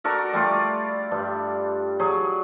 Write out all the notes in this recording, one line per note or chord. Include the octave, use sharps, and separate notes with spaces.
D4 F#4 A4 A#4
G3 A3 F4 D5
G2 D4
F#3 G#4